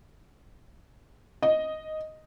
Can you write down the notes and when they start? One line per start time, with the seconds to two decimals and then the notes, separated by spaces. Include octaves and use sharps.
1.42 D#5